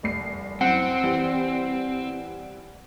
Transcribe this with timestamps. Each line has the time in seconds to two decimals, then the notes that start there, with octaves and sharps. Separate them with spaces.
0.03 F1 C2 C7
0.61 F#2 C4 E4 F#5
1.03 E3 G3